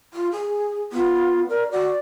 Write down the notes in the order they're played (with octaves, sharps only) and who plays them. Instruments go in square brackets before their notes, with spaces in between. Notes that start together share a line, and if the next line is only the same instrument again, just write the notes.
[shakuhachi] F4
G#4
[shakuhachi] B3 [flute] F4
[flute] A#4 [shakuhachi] D5
[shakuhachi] F#4 [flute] D5